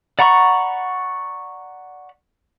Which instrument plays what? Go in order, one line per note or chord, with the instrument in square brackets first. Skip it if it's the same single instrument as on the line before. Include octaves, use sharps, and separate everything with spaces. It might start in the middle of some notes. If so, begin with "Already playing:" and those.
[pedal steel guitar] D5 F#5 A#5 B5 C#6